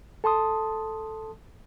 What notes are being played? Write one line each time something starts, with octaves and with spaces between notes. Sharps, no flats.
A4 A5 C6 D#6